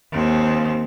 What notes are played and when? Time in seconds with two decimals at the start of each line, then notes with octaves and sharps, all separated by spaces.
0.12 D#2 C4